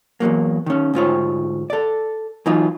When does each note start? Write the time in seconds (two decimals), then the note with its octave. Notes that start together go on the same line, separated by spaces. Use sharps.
0.20 E2 G2 F#3 A#3
0.66 D#3 C#4
0.94 D2 G#2 F4 C#5
1.70 A4 D5
2.46 E3 F#3 D#4 F4